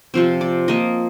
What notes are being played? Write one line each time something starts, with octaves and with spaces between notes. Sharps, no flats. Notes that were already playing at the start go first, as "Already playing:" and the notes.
C3 F3 C4
D5
F3 A#3 D#5